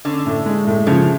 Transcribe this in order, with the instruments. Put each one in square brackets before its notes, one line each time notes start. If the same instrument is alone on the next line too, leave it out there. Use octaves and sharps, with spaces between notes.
[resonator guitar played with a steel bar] D3 [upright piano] C#4
[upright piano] A2
G#3
A2
[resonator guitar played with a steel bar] C#3 [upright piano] F3